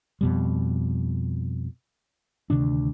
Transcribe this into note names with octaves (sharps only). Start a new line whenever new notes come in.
F2 B2 G3
D2 C3 D#3 D4